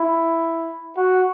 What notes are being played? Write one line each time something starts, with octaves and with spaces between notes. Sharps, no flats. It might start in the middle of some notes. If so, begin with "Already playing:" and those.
Already playing: E4
F#4